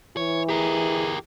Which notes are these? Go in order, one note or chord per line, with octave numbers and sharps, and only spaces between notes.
E3 C#5
G4 G#4 A#4